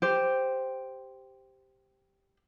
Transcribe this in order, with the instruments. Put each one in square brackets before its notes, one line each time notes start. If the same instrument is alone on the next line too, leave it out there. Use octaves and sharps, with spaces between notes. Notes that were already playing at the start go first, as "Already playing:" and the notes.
[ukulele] G4 C5